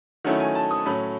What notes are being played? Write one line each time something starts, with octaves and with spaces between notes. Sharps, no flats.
D#3 F#3 A3 C#4 E4 F#5
G#5
A5
D#6
A2 F#3 A3 C#4 B5